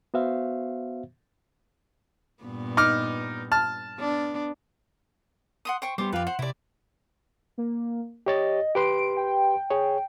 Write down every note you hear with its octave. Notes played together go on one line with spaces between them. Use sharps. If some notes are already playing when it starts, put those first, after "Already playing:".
B3 F#4 C5 E5 F5
G2 A#2 B3
D#4 D6 F6
A5 F6
B3 D4
F#5 C6 D#6
C5 G5 C#6
G3 B3 G4 C5 C6 D6
F2 F4 G4 B4 F5
C5 F#5
C3 E4 G4 D5
A#3
G4 C#5 D#5 A6
G4 B4 C6 D7
G5
G#4 C#5